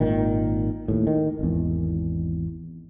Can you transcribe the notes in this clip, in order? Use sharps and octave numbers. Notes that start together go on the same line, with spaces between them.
G#1 A#2 D#3
D#2 A2
D#3
G#1 E2